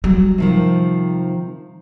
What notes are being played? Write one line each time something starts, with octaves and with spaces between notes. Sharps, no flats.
F#3 G3
C3 D#3 F3